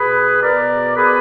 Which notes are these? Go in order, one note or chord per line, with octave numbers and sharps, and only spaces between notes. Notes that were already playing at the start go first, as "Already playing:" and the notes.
Already playing: B2 G#4 B4
B2 A#4 D5
B2 G#4 B4